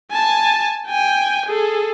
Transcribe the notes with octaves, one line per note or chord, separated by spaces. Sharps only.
G#5 A5
G5 G#5
G#4 A4